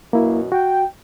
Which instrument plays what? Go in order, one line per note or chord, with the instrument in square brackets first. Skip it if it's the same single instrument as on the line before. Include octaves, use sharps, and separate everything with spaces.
[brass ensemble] F#2 B2 F#4 [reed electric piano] A#3 E4
[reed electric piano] F#4 [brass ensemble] G5